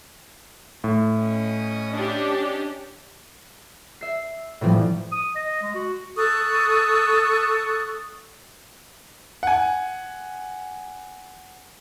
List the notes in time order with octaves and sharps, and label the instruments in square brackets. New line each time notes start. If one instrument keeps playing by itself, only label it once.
[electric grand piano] A2
[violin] C#4 D#5
[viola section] D4 G4
[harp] E5 C7
A2 C3 E3 F3 G3
[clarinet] D#6
D#5
G#3
F#4
[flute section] A4 C#6 D#6 F#6
[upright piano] F#5 G#5